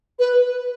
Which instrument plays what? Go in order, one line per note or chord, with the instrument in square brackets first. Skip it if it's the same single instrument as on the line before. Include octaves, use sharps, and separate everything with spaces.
[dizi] B4